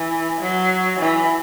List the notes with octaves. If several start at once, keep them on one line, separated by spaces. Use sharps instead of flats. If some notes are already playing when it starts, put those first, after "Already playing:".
Already playing: E3
F#3
E3